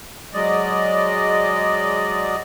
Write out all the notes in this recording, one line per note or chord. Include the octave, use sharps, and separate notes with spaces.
F#3 G#3 D5 D#5